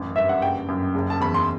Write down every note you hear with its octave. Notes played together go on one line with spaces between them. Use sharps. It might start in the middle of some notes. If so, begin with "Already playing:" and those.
Already playing: A1 F#2
G2 E5
F#5
F#1 G5
F#2
F#1
A5
E2 B5
C6